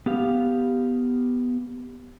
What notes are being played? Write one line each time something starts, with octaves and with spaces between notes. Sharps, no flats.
B3 G4 F5